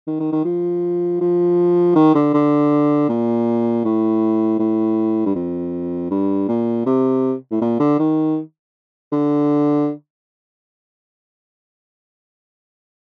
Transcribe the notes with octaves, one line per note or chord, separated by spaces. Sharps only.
D#3
D#3
D#3
F3
F3
D#3
D3
D3
A#2
A2
A2
G2
F2
G2
A#2
C3
A2
A#2
D3
D#3
D3